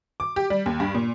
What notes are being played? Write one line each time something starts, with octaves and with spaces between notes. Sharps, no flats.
D6
G4
G3
D#2
G2
A#2